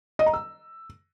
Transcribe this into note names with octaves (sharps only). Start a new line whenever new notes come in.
D#5
A#5
E6